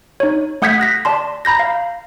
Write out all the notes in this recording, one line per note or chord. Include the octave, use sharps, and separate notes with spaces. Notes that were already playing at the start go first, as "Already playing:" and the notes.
D#4 C#5
A3 F#5 D#6 G6 G#6 B6
F#6 A#6 B6
D5 A5 C6
A#5 B5 G6 A#6
F5